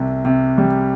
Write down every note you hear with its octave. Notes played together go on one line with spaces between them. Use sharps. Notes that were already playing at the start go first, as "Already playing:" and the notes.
Already playing: C2 C3
C3
G3